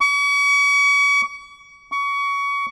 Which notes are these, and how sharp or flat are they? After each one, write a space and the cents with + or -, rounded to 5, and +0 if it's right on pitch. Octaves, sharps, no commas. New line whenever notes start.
C#6 +40
C#6 +25